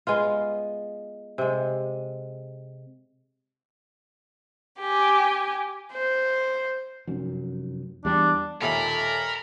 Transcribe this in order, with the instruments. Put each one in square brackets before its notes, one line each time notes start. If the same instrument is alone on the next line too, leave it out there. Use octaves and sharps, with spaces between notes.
[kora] G#3 B3 F4
C3 G#3
[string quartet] G4 G#5
[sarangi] C5
[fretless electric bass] F1 F#2
[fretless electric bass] E2 G3 [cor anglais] D4
[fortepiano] D#2 A#2 E5 [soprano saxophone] A4 [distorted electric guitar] A#4 [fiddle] B5